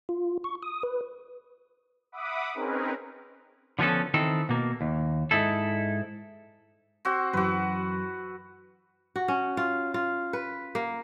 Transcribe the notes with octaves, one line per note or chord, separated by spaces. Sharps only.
F4
C#6
D#6
B4
E5 F#5 B5 D6 D#6
C4 C#4 D#4 G#4 A#4 B4
D3 F3 B3 C#4 A4
D#3 E3 C4 A4
B2 A#3
D#2
G#2 D#4 E4 A4
C4 F#4
F#2 E3 F#4 B4 C6
F#4
C#4
F4
F4
B4
A#3